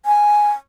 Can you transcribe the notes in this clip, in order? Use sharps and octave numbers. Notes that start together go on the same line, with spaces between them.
G#5